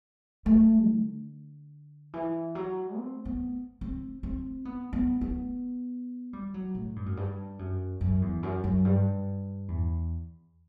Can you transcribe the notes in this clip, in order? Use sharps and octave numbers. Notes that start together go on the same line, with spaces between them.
A3
D3
E3
F#3
C4
B3
C4
C4
B3
B3
B3
G3
F#3
A2
G2
F#2
G2
F#2
F#2
E2
F#2
F#2
G2
E2